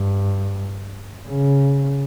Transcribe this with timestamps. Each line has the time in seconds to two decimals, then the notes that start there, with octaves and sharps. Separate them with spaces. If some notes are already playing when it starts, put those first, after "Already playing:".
Already playing: G2
1.28 C#3